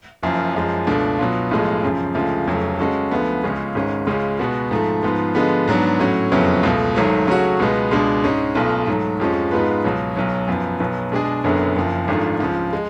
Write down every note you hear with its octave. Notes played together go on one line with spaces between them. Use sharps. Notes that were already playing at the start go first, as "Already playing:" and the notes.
F#1 F#2 F3
F#2 F3 G#3
C#2 B2 A3 D4
B2 F#3 B3 F4
B1 A2 F3 G#3
F#2 C#3 F3
D2 C#3 F3 G#3
F1 F2 C#3 F#3 A3
C#3 G#3 C#4 F#4 A4
D2 D3 F3 B3
C#2 C#3 G#3 C#4
G#1 G#2 G#3 C#4
C#2 C#3 G#3 C#4
B2 G#3 B3 F#4
G#2 F3 A3
G#2 F3 B3 F4
D3 F3 G#3 B3
G#2 F#3 B3 D4
A2 F#3 C#4 F#4
F#1 F2 C#3 F#3 B3
C#2 B2 A3
G#1 G#2 F#3 A3
C#3 F#3 A3 C#4 F#4
C#2 B2 G#3 B3
C#2 B2 G#3 D4
G#2 G#3 C#4
B1 B2 A3 F4
G#2 F#3 A3
F2 F3 G#3 C#4
G#2 G#3 B3 F4 B4
C#2 B2 F#3
B1 B2 F#3
F#2 F3 B3
B1 B2 F#3 B3
B2 G#3 D4 G#4
F#1 F#2 D3 F#3 B3
F#1 F#2 F3
G#1 G#2 F3 A3 D4
C#2 C#3 F3
G#3